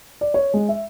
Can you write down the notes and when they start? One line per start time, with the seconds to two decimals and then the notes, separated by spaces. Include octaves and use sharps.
0.21 D5
0.34 C#5
0.54 G#3
0.69 E5